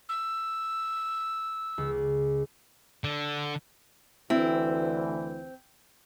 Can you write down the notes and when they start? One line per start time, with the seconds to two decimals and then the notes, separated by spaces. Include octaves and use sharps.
0.09 E6
1.78 C#2
3.04 D3
4.30 D2 E3 C4 E4